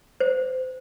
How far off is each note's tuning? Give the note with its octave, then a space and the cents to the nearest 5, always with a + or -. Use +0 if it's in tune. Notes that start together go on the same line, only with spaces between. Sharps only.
C5 -30